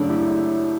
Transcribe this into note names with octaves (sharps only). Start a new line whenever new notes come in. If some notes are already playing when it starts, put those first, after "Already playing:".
Already playing: F#2 C#3 F#3 A3 D4
E4 G4